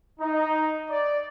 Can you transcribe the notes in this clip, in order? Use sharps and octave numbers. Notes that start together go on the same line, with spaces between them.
D#4
D5